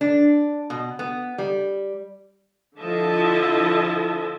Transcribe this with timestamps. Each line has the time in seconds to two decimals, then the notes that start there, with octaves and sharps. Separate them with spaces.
0.01 D4
0.70 B2
0.99 B3
1.38 G3
2.79 D3 F3 E4 D#5 E5 A5